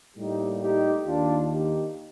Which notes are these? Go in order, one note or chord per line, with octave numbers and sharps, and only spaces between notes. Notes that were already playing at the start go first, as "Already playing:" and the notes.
A2 G3 A#3 D#4 G4
D#4 G4
D#2 D#3 A#3 D4 F4
D#4 G4